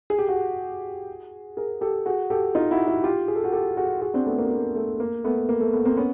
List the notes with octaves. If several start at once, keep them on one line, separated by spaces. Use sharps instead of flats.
G#4
G4
F#4 G#4
G#4 A#4
G4 A4
F#4 G#4
G4 A4
D#4 F4
E4 F#4
E4 F#4
F4 G4
G#4
A4
F#4 G#4
G4 A4
F#4 G#4
F#4 G#4
C4 D4
A3 B3
A#3
A#3
A3
A#3
A3 B3
A#3
A3
A3 B3
A#3 C4
B3 C#4